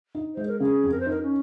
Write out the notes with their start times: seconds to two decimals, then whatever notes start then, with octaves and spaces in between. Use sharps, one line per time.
0.15 D#4
0.35 G#3 C5
0.48 A#4
0.60 C#3 G#4
0.84 F2
0.91 A#4
1.00 C5
1.06 D#4 A#4
1.22 C#4